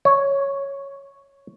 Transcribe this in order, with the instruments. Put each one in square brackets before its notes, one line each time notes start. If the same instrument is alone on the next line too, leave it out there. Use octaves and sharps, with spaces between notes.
[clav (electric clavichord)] C#5